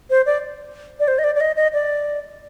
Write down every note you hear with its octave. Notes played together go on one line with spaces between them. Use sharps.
C5
D5
D5
C5
D#5
D5
D5
D#5
D#5
D5